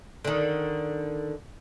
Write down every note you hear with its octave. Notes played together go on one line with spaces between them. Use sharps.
D3 D#3